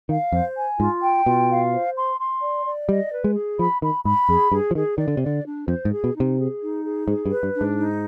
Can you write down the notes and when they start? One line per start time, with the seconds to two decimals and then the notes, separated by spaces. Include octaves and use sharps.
0.09 D#3 F5
0.32 F2 C5
0.56 G#5
0.79 G#2 F4
1.02 G5
1.25 B2 F4
1.49 F5
1.72 C5
1.96 C6
2.19 C6
2.42 D5
2.66 D5
2.89 G3 D#5
3.12 B4
3.24 G#3
3.36 G#4
3.59 F3 B5
3.82 D#3 B5
4.05 G#2 B5
4.29 F2 G#4
4.52 G2 G#4
4.71 F3
4.75 D#3 G#4
4.98 D#3 D5
5.08 D3
5.17 C3
5.22 D3 D5
5.45 D4
5.68 F2 C5
5.85 G#2
5.91 G#4
6.04 B2
6.15 D#4
6.20 C3
6.38 G#4
6.61 D#4
6.85 G#4
7.08 G#2 G#4
7.26 G2
7.31 B4
7.43 G2
7.55 D4
7.61 G#2
7.78 D#4